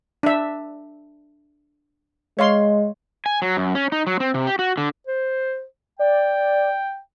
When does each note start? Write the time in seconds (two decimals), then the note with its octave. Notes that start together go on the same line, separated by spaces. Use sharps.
0.23 D4 E5
2.39 G#3 C#5 F5 C6
3.26 G#5
3.42 F#3
3.57 F#2
3.75 C#4
3.92 D#4
4.07 F#3
4.20 C4
4.34 C3
4.47 G4
4.59 F#4
4.77 D3
5.07 C5
5.99 D5 G5